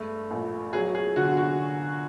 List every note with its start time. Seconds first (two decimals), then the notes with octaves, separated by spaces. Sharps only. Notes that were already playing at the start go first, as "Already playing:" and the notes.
Already playing: G2 G#3 A3
0.31 A#1
0.73 F#3 G#4
0.95 G#4
1.16 D3 F#4
1.37 F#4